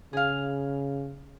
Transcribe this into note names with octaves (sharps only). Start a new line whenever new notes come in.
C#3 G#4 F5